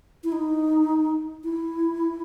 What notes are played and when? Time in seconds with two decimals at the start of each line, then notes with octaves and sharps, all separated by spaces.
0.24 E4
0.32 D#4
1.44 E4